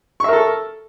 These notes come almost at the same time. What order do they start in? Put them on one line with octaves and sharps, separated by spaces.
C#6 E5 A#4 A4